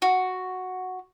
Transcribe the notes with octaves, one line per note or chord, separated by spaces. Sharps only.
F#4